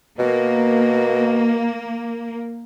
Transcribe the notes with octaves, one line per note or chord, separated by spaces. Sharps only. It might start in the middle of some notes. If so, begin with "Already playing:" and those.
B2 A#3